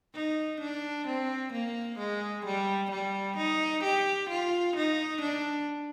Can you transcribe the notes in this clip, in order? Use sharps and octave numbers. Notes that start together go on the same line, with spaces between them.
D#4
D4
C4
A#3
G#3
G3
G3
D#4
G4
F4
D#4
D4